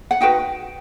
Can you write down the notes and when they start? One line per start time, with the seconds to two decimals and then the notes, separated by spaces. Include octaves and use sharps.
0.11 F#5
0.20 D#4 F#4 B4 G5